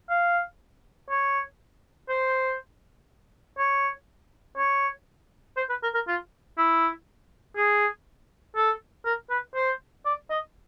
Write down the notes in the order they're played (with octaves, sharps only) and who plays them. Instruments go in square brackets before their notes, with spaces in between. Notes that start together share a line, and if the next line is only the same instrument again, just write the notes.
[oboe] F5
C#5
C5
C#5
C#5
C5
B4
A#4
A#4
F4
E4
G#4
A4
A#4
B4
C5
D5
D#5